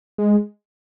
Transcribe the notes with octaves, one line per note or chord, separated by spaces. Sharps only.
G#3